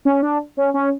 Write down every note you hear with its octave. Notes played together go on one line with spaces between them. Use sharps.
C#4
D4
C#4
C#4